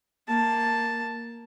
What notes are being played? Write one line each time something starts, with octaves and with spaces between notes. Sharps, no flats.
A#3 A5